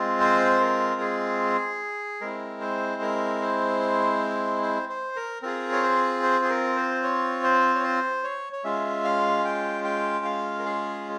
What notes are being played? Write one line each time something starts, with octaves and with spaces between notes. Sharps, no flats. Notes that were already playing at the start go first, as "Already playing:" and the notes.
Already playing: G#3 C4 F4
C5
A#4
G#4
G#3 C4 E4 A#4
C5
A#4
C5
C5
C5
A#4
C4 F4 G#4 A#4
C#5
C5
C5
G#4
A#4
C5
C#5
C5
C#5
C5
C#5
C#5
G#3 C#4 F4 E5
F5
G5
G5
F5
A#4
G#4